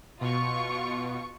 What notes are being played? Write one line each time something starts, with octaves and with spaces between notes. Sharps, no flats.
B2 F4 C#6